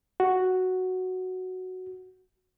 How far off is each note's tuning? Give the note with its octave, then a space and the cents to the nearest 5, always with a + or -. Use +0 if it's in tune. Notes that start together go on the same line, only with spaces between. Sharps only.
F#4 +0